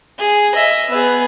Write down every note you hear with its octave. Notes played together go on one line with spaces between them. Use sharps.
G#4
D#5 E5
B3 G#4